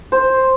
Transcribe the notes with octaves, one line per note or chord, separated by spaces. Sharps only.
C5